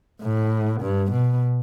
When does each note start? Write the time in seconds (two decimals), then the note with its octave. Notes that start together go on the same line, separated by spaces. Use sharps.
0.22 A2
0.82 G2
1.12 B2